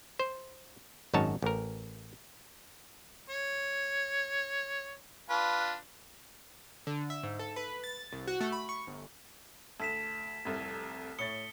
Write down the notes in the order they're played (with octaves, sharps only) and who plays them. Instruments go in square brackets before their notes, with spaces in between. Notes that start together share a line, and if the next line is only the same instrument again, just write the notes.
[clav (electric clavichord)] C5
G#1 F#2 D#4 C#5 A5
A1 A#4
[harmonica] C#5
D4 F4 B4
[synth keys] D3
E5
G#2
A4
B4
A6
C2
F#4
A3
B5
C#6
G1
[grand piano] D2 [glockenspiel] A5 B6 E7
[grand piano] F1 C2 F2
[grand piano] A2 C#5 A6 [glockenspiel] D#6 C#7 G7